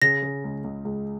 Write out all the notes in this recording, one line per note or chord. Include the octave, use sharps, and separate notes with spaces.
C#3 A#6
C#3
C#2
C#2
C#2